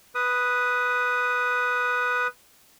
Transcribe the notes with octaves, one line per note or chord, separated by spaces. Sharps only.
B4 D#6